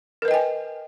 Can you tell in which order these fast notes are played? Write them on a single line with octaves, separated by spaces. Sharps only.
A#4 B4 D#5 G5 G#5